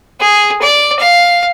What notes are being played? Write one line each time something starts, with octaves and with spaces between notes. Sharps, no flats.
G#4
D5
F5